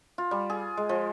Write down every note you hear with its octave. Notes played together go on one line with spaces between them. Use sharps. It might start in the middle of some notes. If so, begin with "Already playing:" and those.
F4
G3
G#4
G#3
F3